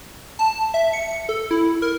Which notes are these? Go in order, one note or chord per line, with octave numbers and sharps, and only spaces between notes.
A5
E5
C#7
A4
E4
A#4